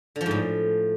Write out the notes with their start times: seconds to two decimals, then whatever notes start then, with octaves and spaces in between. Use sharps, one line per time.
0.16 D3
0.21 F3
0.26 G#2
0.31 A2